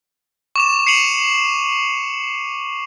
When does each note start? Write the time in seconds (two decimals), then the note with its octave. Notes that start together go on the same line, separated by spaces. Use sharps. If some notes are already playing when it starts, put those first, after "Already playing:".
0.56 C#6 D6 E7
0.87 C7 C#7 D#7 F7 F#7